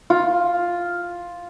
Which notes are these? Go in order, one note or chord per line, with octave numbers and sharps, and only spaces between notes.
F4